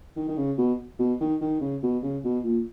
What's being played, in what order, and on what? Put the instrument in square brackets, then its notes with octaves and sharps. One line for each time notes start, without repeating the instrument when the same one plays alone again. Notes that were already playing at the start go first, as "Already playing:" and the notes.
[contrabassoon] D#3
D#3
C#3
B2
B2
D#3
D#3
C#3
B2
C#3
B2
A#2